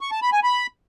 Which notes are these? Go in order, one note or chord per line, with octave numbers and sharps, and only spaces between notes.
C#6
A5
B5
G#5
B5